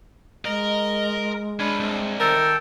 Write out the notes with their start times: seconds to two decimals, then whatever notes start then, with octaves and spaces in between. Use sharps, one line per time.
0.45 G#3 A#4 D#5
1.60 C#4 D4 B4
1.81 C2
2.20 D#3 A4 A#4 G5 A5